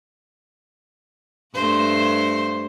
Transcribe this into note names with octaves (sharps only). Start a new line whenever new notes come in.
G2 A3 C5